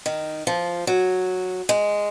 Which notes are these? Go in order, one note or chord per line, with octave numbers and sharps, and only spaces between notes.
D#3
F3
F#3
G#3